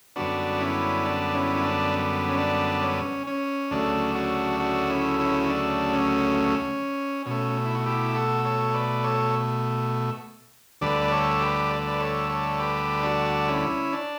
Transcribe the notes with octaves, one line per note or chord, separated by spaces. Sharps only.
F#2 D3 G3 B3 D4 F#4
C#4 E4
D4
C#4 E4
E4
D4
C#4
D4
C#4
C#4
D2 C#3 F#3 A3 D4
D4 F#4
D4 F#4
C#4 E4
C#4 E4
D4
C#4
B2 A3 C#4
E4
F#4
E4 G4
F#4 A4
A4 C#5
B4 D5
A4 C#5
D2 D3 G3 B4 D5
B4
A4 C#5
G4 B4
D5
B4 D5
A4 C#5
A4 C#5
G4 B4
D4 F#4
C#4 E4
D4